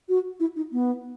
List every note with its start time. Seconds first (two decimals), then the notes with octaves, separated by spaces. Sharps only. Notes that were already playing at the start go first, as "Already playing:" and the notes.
0.09 F#4
0.40 E4
0.56 D#4
0.72 B3